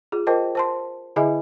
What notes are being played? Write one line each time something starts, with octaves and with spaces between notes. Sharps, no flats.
F4 G#4
F4 A#4 C5 D#5 G5 A5
C5 A5 C6
D3 E4 G#4 D#5 E5 G#5